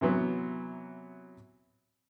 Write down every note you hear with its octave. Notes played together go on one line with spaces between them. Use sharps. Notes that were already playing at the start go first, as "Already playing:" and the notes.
C3 E3 F#3 B3